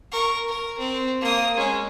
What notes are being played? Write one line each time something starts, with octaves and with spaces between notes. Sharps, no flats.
A#4 C#6
A#4
C4
A#3 D#6
G#3 C#4